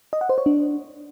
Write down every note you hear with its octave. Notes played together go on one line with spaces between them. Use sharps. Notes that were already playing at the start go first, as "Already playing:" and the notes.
D#5
F#5
C5
C#5
D4